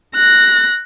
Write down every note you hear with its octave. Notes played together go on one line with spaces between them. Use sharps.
F#6 A#6